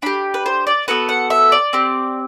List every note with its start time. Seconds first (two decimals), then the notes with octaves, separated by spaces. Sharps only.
0.02 D4 G4 B5
0.34 B4
0.46 C5
0.67 D5
0.88 B3 F#4 A4 B4
1.09 F#5
1.30 E5
1.52 D5
1.73 C4 G4